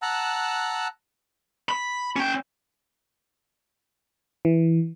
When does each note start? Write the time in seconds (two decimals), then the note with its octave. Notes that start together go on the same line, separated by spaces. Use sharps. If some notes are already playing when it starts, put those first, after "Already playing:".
0.02 F#5 A5 A#5 E6 F#6
1.69 B5
2.16 C#4 G5
4.45 E3